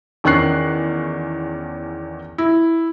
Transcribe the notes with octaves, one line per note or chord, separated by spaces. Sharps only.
E2 D#3 C#4 C#6 F#6 C7
E4